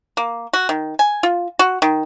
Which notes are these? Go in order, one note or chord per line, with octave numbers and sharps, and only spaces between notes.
A#3
F#4
D#3
G#5
F4
F#4
D#3